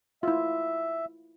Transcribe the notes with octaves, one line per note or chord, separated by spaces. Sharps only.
E4 F4 E5